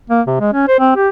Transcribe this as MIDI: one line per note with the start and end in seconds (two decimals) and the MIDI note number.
0.10 0.21 58
0.27 0.36 48
0.40 0.53 56
0.53 0.68 61
0.68 0.76 72
0.80 0.96 60
0.96 1.09 67